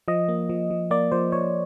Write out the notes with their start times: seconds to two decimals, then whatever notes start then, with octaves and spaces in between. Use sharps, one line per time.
0.08 F3 D#5
0.28 A#3
0.49 F3
0.70 F3
0.91 A#3 D5
1.12 F3 C5
1.32 F3 C#5